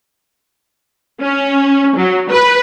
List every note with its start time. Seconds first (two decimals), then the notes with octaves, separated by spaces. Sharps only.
1.21 C#4
1.96 F#3
2.30 B4